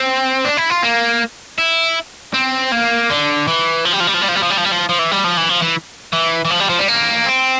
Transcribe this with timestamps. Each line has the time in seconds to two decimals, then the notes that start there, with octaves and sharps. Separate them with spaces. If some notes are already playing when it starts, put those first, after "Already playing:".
Already playing: C4
0.45 D4
0.57 E4
0.70 F4
0.83 A#3
1.58 E4
2.34 C4
2.72 A#3
3.10 D3
3.47 E3
3.85 F3
3.93 G3
4.00 F3
4.07 G3
4.14 F3
4.22 G3
4.29 F3
4.36 G3
4.43 F3
4.50 G3
4.58 F3
4.65 G3
4.72 F3
4.89 F3
4.99 E3
5.11 G3
5.24 F3
5.37 E3
5.49 F3
5.62 E3
6.13 E3
6.45 E3
6.51 F3
6.60 G3
6.70 F3
6.79 G3
6.88 A#3
7.26 C4